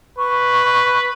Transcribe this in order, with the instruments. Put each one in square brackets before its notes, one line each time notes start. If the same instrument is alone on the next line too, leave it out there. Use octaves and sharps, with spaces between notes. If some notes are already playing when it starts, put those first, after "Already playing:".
[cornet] B4 [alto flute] C#6